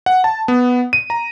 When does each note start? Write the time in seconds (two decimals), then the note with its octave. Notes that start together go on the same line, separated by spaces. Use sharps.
0.06 F#5
0.24 A5
0.48 B3
0.93 D#7
1.10 A#5